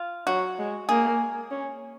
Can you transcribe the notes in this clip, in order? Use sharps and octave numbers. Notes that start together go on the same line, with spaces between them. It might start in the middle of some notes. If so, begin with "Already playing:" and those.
Already playing: F4
F#3 F#4
G#3
A#3 G#4
C#4